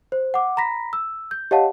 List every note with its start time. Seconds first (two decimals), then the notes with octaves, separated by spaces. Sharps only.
0.12 C5
0.34 F#5 D6
0.57 A#5 B5 A#6 B6
0.93 E6
1.31 G6
1.51 G4 C#5 D#5 F5 F#5 A5